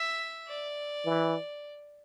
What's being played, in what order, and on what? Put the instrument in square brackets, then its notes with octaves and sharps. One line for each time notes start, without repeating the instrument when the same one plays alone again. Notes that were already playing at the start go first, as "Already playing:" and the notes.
Already playing: [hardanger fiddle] E5
D5
[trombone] E3